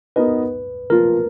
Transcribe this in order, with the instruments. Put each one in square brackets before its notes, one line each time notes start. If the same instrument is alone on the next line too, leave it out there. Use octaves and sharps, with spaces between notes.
[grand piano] B3 D#4 F#4 A#4 D#5 [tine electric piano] B4
[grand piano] F3 A#3 F4 [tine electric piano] A#4